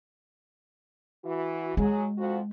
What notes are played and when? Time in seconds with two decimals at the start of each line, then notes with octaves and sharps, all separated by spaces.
1.24 E3 F#4
1.77 F#3 G#3 G#4
2.18 F2 F3 F#4